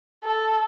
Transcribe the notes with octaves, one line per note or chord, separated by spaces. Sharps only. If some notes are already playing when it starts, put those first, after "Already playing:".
A4